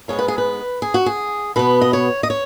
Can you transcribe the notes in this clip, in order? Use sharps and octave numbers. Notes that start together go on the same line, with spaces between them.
G#2 G#3 B3 C#5
B4
G#4
B4
G#4
F#4
G#4
B2 B3 B4
D#5
C#5
D#5
C#5